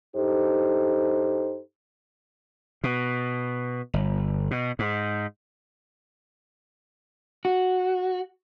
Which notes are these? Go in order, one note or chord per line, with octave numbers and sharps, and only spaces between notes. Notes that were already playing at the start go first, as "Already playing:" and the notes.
G2 D#4 G4 A4 C5
B2
G1
B2
G#2
F#4